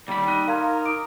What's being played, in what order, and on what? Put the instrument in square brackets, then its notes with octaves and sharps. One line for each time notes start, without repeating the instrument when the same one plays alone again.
[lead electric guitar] D#2 B5 [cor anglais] G3
[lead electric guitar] D#4 [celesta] F#6
[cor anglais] A#4 [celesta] F5 C6 G#6
[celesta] D6 D#6 D7